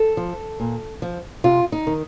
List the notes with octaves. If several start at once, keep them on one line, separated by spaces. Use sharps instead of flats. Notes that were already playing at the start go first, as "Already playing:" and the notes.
Already playing: A4
F3
A#2
F3
C3 F4
D#4
D#3